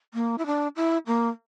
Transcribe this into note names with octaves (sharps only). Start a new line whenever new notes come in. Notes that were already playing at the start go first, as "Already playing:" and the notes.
A#3
E4
D4
E4
A#3